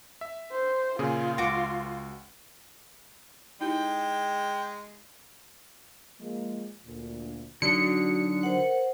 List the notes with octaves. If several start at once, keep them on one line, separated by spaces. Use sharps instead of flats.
E5
C5
A#2 C#3 F4 G#4
C#2 F#4 D6
G#3 D#4 E4 G4 G5
F3 G#3 A#3
D2 A#2
D3 F#3 D4 D#4 F#4 D5 C#7
A#4 C5 F#5